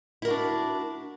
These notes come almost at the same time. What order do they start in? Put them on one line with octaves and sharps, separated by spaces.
E4 A#4 F#4 D4